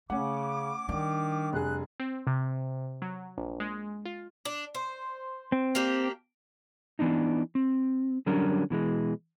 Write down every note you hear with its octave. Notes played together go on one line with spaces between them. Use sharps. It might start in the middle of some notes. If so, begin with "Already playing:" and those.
C#3 A3 C#4 F#5 D6
D#3 G3 D4
F1 G#4 F#6
C4
C3
F#3
A#1
G#3
F4
D4
C5
C4
A#3 D4 G4
E3 B3 D4 D#4
C4
D3 F#3 G3 C#4 D4 A#4
B2 E3 G#3